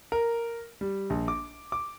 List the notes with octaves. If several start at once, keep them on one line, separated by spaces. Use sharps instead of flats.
A#4
G3
A#1
D6
D6